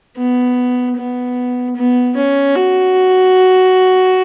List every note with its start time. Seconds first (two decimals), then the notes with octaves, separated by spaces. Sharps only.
0.17 B3
0.97 B3
1.76 B3
2.16 C#4
2.55 F#4